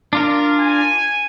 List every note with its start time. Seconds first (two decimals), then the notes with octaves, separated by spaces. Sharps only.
0.13 D4 F4 A#4
0.57 G#5